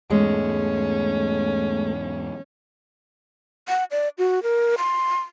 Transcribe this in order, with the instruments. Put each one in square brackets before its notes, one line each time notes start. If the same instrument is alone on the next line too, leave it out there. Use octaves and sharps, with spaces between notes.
[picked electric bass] E2 G#2 [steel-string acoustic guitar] G#3 [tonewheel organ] A3 [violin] C#4
[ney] F#5
D5
F#4
A#4
C6